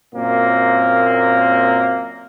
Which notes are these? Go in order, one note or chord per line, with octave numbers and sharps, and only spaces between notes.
F#2 A#2 A#3 C4